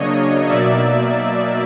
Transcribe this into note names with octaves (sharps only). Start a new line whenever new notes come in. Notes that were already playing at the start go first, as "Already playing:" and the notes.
Already playing: C#3 F#3 A#3 D4 C#5 D#5
B2 F#3 A#3 D#4 D5 E5